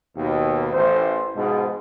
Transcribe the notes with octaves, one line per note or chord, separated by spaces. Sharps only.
D#2 B2
A1 C5
G#2 B2 F3 G#3